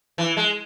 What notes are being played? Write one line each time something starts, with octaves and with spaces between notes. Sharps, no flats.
E3
G#3